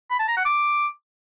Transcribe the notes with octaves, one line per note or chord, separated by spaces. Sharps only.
B5
A5
A#5
F#5
D6